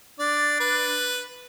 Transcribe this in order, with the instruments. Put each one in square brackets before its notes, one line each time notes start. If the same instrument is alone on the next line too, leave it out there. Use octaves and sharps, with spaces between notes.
[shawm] D4 [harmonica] D5
[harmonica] B4